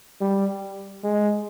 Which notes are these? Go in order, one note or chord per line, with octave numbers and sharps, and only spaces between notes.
G3
G#3